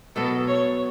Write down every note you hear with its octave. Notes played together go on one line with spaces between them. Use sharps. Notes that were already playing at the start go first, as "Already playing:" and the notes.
B2 F#3 B3 A4
C#5